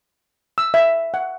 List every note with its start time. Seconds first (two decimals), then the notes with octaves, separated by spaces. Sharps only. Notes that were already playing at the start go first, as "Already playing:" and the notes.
0.58 E6
0.74 E5
1.14 F#5